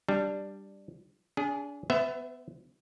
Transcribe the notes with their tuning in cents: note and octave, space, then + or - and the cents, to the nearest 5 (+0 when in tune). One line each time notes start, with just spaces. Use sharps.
G3 +0 D4 +10
D4 -30 G#4 +0
B3 +20 C5 -35 E5 +0